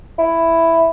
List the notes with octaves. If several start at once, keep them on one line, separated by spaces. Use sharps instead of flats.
E4